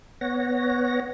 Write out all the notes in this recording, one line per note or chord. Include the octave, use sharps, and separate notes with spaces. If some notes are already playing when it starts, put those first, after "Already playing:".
B3 C#5 F#5 A#6